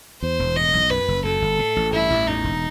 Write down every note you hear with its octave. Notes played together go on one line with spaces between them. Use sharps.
E2 C5
E1
A2 D#5
B1
F#2 B4
F#1
F#2 A4
G1
A2
A1
G2 E4
A1
E2 D#4
E1